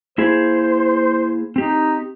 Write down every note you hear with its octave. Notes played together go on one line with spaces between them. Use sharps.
A#3 E4 G#4 C5
C4 D#4 G4